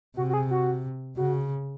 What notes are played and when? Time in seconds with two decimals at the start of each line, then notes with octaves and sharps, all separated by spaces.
0.17 C3 F#4
0.29 F#4
0.34 G#4
0.51 F#4
1.17 C#3 F#4